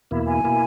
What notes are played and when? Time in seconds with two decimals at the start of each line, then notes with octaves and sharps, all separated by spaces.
0.11 E2 B2 A#3 E4
0.27 G#5
0.44 B2 A#3 E4